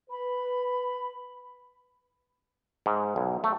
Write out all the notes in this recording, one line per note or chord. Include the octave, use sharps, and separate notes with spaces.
B4 B5
G#2
B1
A3